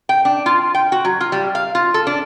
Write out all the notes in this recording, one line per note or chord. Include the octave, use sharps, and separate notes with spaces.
G5
D4
F4
G5
F#4
F#3
F4
G3
F5
F4
A4
D4